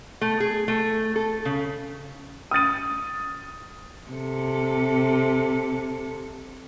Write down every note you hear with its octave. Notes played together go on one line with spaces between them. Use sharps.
A3
G#4
A3
A4
C#3
D#6 F6 A6 D#7
C3 A4